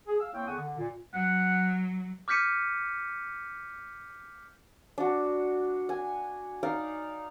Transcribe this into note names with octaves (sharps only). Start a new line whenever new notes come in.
G#4
F5 E6
A#3 C4 E4 C#5 G5
E2 D3 F#5 G#5 C#6 D#6
D3
A#2
F#3 F#5
D6 F6 G6 B6 C#7 D#7
D4 F#4
G#5
D#4 D5 F5